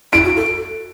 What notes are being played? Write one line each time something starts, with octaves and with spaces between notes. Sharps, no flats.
E4 D7
F#4
A4